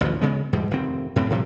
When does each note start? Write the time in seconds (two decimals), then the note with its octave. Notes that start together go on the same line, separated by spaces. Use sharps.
0.01 A1 D2 G#2 F3
0.21 C#3 G#3 B3
0.53 E2 G#2 B2 G3
0.71 F1 D#3 C4
1.16 F#2 A2 C4
1.30 A2 C3 F3 G3